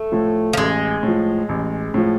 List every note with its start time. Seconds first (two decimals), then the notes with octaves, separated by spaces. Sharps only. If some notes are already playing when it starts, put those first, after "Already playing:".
Already playing: A3
0.12 A2 F3
0.53 F3
0.57 A1 G#3
1.03 A2 F3
1.49 A1
1.94 A2 F3